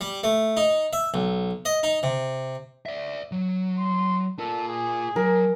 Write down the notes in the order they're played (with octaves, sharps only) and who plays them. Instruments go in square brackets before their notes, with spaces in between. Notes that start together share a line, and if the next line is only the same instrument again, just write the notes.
[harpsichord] G3
A3
D#4
E5
B1
D#5
D#4
C3
[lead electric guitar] D5 E5
F#3
[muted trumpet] C6
[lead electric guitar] F4 A#4 [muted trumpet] A4
[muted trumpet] G#4
[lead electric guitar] F#3 [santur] A#4